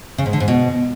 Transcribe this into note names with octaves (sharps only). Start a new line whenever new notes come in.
C#3
G#2
D3
G#2
B2